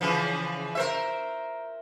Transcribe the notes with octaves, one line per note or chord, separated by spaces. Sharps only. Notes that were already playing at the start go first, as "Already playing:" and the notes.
C#3 E3 F3
A#4 C5 E5